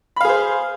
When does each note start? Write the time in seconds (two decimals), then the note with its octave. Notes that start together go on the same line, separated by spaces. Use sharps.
0.16 B5
0.21 F5
0.25 G#4
0.29 C5